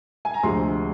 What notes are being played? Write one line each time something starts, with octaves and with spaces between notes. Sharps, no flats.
G#5
A#5
D2 C3 F3 G#3 C6